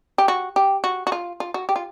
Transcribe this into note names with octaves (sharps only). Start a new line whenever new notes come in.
G4
F#4
G4
F#4
F#4
F4
F4
F#4
G4
F4